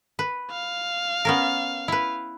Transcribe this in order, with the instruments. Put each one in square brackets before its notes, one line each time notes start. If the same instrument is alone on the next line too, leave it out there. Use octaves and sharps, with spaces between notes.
[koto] B4
[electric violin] F5
[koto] B3 C#4 A#4
E4 B4